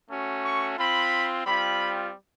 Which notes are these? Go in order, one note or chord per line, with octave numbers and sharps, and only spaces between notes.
A3 C#4 F#4
C#6
C4 F4 B5
G3 C4 F4 B5